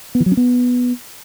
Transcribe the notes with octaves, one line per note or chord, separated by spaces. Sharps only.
B3
E3
F#3
C#4
B3